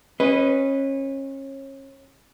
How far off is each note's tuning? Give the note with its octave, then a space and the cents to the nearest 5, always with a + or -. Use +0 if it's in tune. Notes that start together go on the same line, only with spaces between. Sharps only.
C#4 -30 B4 +0 D#5 +0